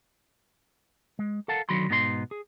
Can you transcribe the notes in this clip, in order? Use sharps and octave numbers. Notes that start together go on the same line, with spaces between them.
G#3
A4 A#4 F5 F#5 A5
D3 D#3 F#3 F#4 B5 C6
G#2 B2 B3 D#4 A#4 C6
G#4